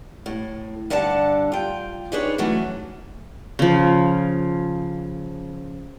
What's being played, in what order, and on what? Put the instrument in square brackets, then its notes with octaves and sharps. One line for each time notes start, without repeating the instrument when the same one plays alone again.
[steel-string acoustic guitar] A2
G2 D3 D5 F#5 A5
F4 G5
D4 D#4 G#4 B4 C#5
E3 F#3 A3 C#4 F#4
[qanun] C#3 F3